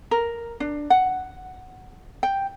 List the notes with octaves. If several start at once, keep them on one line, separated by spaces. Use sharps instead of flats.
A#4
D4
F#5
G5